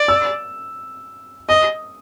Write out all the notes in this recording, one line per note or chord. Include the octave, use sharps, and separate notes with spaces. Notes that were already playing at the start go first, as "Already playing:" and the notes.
Already playing: D5
E6
D#5 D#6